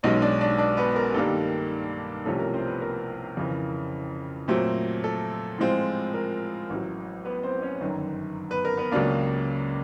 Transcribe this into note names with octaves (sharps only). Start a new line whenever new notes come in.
B1 B2 G#3 C#4 D#4 D#5
D4 D5
D4 D5
D4 D5
B3 B4
A#4
G2 D#3 G3 A#3 D4 A4
C2 C3 F3 A3 C#4 A4
A#4
C4 C5
B3 B4
A#4
F2 C#3 E3
A#2 F#3 A3 C4
A4
A2 F3 G#3 C4 F4
A#4
A1 A2 F#3
B3 B4
C4 C5
C#4 C#5
G1 F#2 D#3
B3 B4
A#4
B3 B4
C#2 C#3 F#3 A#3 D4 D5